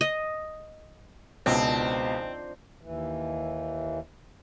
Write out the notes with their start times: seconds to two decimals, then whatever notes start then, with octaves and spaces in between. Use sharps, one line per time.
0.01 D#5
1.46 C#2 B2 D#3 F3 C4 D4
2.81 D#2 E3